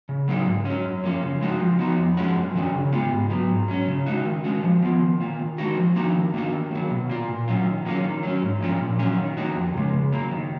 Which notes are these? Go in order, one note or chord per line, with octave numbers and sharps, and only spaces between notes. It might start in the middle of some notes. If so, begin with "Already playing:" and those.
C#3
F#3 A#3 D#4
G#2
F#3 C#4
F#2
F3 A#3 C#4
C#3
G#3 D#4 F#4
F3
B3 D#4 F#4
F2
F3 G#3 C#4 F#4
F#2
D#3 F#3 C#4 F#4
C#3
G#3 B3 F4
G#2
F#3 B3
G#2
F#3 C#4
C#3
G#3 D#4 F#4
D#3
G#3 C#4 F#4
F3
B3 F4
D#3
A#3 F4
D#3
G#3 D#4 F#4
F3
A#3 D#4 F#4
D#3
A#3 D#4 F#4
D#3
F#3 A#3
B2
A#3 F4
A#2
F#3 C#4 F4
D#3
F#3 A#3 C#4 F4
D#3
F#3 A#3 C#4
G#2
F3 A#3 C#4 F4
A#2
F#3 A#3 C#4
D#3
A#3 D#4 F#4
F2
C#3 G#3
C#3
F#3 A#3
D#3